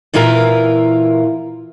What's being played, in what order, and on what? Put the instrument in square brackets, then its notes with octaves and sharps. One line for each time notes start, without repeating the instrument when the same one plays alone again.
[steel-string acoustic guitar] A#2 E3 E4 F4 A#4